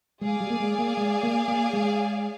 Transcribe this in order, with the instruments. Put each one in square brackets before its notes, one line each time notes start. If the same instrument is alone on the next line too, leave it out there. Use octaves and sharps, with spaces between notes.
[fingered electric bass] G#3 [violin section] G#4 D5 F5 G#5
[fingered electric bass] G3
A#3
G#3
A#3
G#3
A#3
A#3
G#3